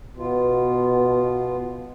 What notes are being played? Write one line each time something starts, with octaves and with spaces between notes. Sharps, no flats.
B2 B3 F4